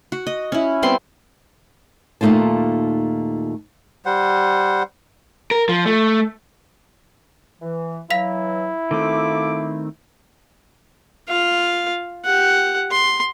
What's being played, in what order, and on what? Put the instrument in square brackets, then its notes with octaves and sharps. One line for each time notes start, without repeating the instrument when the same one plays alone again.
[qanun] F#4
D#5
C#4 E4
G3 B3 C4 C6
[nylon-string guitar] D#2 A#2 A3 D#4 F4 A5
[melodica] G3 C5 F#5
[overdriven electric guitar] A#4
F3
A3
[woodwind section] E3
[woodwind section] E3 F#3 [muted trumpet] E4 [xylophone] F5 B6 F7
[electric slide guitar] D#3 A3 C4 [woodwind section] F4 A4 D6
[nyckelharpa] F4 F5
G4 F#5
C6